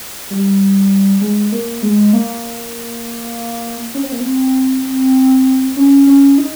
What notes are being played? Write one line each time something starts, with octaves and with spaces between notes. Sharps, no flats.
G3
G#3
A#3
G#3
A#3
C#4
C4
A#3
C4
C#4
C#4
D#4